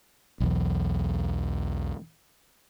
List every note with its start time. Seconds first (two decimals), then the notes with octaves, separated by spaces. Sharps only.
0.40 B1 E2